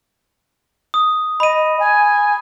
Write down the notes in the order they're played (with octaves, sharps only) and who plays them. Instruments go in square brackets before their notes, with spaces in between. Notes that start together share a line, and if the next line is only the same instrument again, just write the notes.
[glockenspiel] D#6
[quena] D#5 [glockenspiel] B5 D#7
[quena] G#5